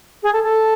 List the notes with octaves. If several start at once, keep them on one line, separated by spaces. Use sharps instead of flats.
G#4
A4
A4